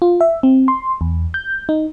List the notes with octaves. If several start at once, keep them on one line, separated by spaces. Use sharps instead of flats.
F4
E5
C4
C6
E2
G6
D#4